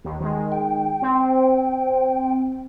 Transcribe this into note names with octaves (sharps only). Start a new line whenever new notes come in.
D#2
D#3 G#3
G5
C4